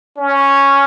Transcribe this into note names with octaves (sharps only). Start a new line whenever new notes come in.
C#4